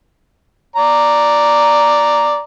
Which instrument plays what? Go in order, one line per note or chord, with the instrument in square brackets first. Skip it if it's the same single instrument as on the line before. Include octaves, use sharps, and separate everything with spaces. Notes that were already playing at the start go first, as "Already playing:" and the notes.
[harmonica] D5 A#5